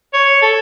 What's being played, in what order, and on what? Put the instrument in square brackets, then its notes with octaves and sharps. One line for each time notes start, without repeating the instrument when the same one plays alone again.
[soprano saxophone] C#5
A4